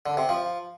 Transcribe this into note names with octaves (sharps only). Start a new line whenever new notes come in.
D3
C3
F3